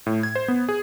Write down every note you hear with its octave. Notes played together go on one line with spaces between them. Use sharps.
A2
G#6
C5
B3
G#4